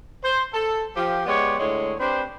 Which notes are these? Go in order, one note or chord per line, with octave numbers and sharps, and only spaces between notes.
C5
A4
F3 G4
G#3 B3 G4 C#5 D5
A2 D3 G#3 C#5
C4 D4 G4 B4 C5